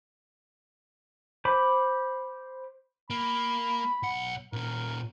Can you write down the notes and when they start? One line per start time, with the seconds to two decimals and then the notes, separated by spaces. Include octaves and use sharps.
1.45 C5 B5 D6
3.10 A#3 B5
4.03 B1 F#5
4.53 A#2 C#4 A#4